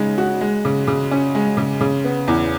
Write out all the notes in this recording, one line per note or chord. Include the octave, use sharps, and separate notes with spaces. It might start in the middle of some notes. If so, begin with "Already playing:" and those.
Already playing: C#3 G#3 D#4
F#4
G#3
C#3
C#3
C#4
G#3
C#3
C#3
B3
E2